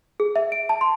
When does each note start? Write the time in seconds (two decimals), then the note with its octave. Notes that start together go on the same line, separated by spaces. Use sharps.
0.20 G#4
0.36 E5
0.52 D7
0.69 A5
0.81 C6